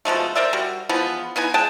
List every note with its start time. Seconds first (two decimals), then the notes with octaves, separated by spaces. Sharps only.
0.05 B2 F3 G#3 A3
0.35 A#4 C5 D5 E5
0.53 G3 F#4
0.89 E3 F3 G#3 B3
1.36 E3 B3 D#4 G#5
1.54 G#3 G5 A5